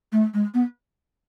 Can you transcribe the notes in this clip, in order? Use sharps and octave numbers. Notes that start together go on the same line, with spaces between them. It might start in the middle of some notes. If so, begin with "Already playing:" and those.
A3
G#3
B3